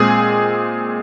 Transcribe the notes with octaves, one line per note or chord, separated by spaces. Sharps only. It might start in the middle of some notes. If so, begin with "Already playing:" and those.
Already playing: A#2 G#3 C4 G#4